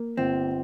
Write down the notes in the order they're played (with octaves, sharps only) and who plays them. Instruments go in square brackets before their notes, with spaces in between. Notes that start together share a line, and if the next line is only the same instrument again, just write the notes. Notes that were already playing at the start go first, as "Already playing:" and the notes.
Already playing: [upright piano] A#3
[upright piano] G1 [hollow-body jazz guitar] C4